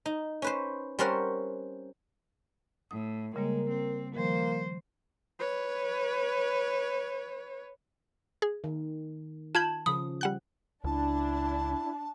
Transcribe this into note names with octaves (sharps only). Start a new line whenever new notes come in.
D#4
C#4 B4 C5
G3 C4 C#4 A#4 C5 F#5
A2 D#6
C#3 G3 G#3 A#3 A#4
C4
D#3 F3 G3 A#3 C5
B4 C#5
G#4
D#3
F4 A5 B5 G6 G#6 F#7
C#3 F3 B5 D#6
G3 F#5 F#6
C#2 D4 E4 A5